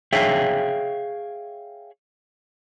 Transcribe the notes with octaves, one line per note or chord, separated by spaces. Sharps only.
G#4 C#5 E5 F5 G5